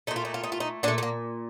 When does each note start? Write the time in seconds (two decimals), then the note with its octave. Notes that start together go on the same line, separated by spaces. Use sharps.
0.07 A3 D#4
0.11 A#2
0.16 F4
0.25 D#4
0.34 F4
0.43 D#4
0.52 F4
0.60 D#4
0.83 A#2 D4
0.88 A3
0.98 A3
1.03 A#3